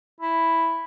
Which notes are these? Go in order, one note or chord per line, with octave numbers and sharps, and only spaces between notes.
E4